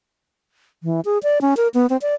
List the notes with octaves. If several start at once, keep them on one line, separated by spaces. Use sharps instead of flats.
E3
G#4
D5
C#4
A#4
B3
C4
D5